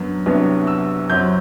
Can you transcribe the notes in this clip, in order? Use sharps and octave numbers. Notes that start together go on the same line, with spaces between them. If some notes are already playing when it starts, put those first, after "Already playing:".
Already playing: F#2 F#3 B3 D4
C2 C3 F#3 B3 D4
E6
F#2 F#3 C4 G6